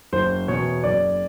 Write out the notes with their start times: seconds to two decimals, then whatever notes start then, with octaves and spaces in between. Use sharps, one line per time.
0.13 F#1 C5
0.48 E2 B2 C#5
0.84 F#1 D5